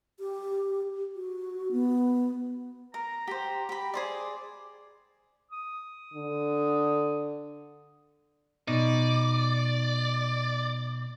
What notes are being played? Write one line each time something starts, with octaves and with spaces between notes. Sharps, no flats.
G4
F#4
B3
A#4 A#5
G4 C5
G4 B5
G#4 C5 D5 D6
D#6
D3
B2 D#4 D5